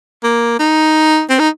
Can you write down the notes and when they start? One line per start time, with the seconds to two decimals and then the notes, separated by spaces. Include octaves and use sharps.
0.24 A#3
0.59 D#4
1.30 C4
1.39 D#4